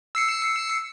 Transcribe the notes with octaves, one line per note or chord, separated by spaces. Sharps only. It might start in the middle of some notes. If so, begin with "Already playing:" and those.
E6 C7 C#7